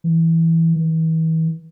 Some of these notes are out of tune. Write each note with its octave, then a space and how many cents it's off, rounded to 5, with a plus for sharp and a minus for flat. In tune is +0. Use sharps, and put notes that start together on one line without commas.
E3 -5
E3 -40